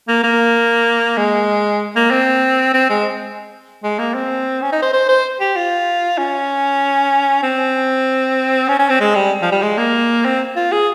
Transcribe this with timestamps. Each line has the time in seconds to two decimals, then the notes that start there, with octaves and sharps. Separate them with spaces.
0.08 A#3
0.23 A#3
1.17 G#3
1.96 A#3
2.11 C4
2.74 C4
2.90 G#3
3.84 G#3
3.99 A#3
4.15 C4
4.62 C#4
4.72 D#4
4.82 C5
4.93 C5
5.09 C5
5.40 G4
5.56 F4
6.18 C#4
7.43 C4
8.69 C#4
8.79 C#4
8.90 C4
9.00 G#3
9.15 G3
9.42 F3
9.52 G3
9.62 G#3
9.78 A#3
10.25 C4
10.56 F4
10.72 G#4